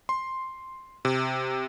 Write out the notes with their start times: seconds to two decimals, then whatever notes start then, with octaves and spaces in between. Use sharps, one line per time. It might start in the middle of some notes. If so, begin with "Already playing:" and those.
0.09 C6
1.05 C3